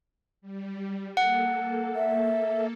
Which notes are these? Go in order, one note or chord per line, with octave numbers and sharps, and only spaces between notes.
G3
A#3 A4 F#5
E5